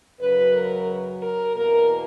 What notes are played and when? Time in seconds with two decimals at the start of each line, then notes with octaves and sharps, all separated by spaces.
0.20 F#2 C#3 F#3 B4
0.54 A#4
1.22 A#4
1.56 E2 B2 A#3 A#4